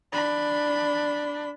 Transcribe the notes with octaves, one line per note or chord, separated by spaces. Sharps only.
D4 B5